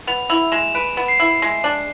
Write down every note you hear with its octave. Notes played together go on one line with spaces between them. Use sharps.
B3 F7
E4 F7
G#3 E7
B4 D7
B3
C7
E4
G#3
D4